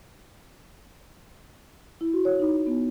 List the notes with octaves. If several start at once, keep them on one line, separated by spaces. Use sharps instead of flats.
E4
F#4
C#5
D#4
B3